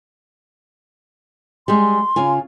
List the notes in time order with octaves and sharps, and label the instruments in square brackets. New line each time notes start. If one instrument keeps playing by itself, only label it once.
[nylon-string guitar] G3 G#3 G#4 [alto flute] C6
[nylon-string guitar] C#3 F4 G#5